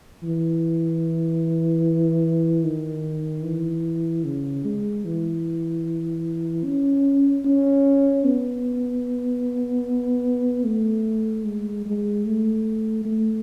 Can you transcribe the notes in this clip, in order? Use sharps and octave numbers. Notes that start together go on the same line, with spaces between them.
E3
D#3
E3
C#3
G#3
E3
C#4
C#4
B3
A3
G#3
G#3
A3
A3